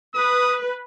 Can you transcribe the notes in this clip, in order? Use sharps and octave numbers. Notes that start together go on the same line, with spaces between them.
B4 D#6